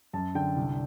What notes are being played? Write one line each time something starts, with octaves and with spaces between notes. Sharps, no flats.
F#2 A5
D3 G5
C2